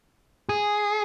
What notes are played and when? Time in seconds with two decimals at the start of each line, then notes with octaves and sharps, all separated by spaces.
0.49 G#4